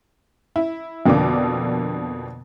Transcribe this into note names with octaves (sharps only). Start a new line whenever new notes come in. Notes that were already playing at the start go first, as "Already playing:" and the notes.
E4
F2 B2 D3 A#3 D4 D6